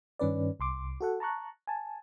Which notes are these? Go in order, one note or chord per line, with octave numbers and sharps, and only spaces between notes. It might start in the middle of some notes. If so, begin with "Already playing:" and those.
G2 D#3 C#4 B4 D5
C2 C6 D6
F#4 A4 F#5
A5 A#5 C#6 F#6
G#5 A5